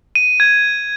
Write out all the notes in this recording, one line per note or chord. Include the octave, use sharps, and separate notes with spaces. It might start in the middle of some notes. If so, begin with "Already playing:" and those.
D#7
G#6